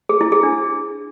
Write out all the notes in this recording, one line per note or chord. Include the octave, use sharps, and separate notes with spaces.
G#4
E4
G#4
D4